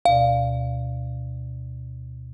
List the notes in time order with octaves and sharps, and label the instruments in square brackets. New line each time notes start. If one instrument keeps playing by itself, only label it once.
[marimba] D2 B2 D5 [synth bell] F5